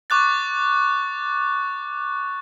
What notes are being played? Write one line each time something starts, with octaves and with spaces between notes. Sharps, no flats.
C#6 D6 F#6 A6